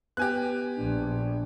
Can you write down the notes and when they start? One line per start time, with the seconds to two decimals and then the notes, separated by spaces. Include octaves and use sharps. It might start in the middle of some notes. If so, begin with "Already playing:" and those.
0.17 B3 G4 G#5 F#6
0.78 A#1 D4